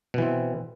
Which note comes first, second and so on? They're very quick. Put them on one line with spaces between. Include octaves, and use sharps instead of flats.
B2 E3 C4